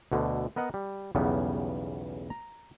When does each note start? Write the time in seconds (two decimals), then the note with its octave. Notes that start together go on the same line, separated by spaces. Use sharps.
0.12 D2 B2 D3
0.56 B3 A#4 D#5 F#5
0.74 G3
1.15 B1 E2 C#3 G3 B3
2.30 A#5